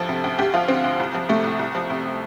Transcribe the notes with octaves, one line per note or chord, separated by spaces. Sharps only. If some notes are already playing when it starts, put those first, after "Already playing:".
Already playing: D2 F3 A4
C3
D2
D2 G4
F3 F4
D3 C4
D2
C2
F3
C3 A3
C2
C2
F3
C3